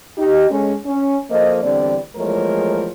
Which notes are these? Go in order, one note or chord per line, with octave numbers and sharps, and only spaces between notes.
D#4 G4
G#3 C#4 A4
C#4
F3 A#3 A4 C5 D#5
E2 D3 G3 C4 D5
E2 F3 G#3 A3 A#4 C#5